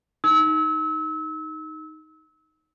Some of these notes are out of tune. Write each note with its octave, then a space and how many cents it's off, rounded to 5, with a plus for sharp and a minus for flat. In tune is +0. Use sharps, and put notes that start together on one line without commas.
D#4 +0 E6 -30